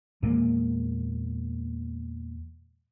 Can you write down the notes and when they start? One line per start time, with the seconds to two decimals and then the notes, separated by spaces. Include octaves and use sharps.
0.22 E2 A#2 G#3 A#3